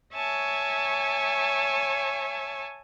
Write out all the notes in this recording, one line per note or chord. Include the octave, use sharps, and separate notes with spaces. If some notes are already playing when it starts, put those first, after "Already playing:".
C#5 E5 G#5 A5 C#6